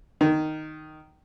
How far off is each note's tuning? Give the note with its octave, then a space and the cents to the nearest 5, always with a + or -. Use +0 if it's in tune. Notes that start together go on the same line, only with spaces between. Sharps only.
D#3 -5